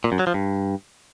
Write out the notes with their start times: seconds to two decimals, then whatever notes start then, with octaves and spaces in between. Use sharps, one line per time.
0.04 A#2
0.12 F#2
0.19 F#3
0.27 F3
0.34 G2